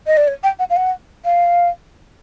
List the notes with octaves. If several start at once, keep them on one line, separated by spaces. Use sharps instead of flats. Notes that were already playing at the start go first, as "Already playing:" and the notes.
D#5
D5
C#5
G5
F#5
F5
F#5
F5